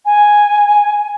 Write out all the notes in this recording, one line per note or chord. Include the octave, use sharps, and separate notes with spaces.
G#5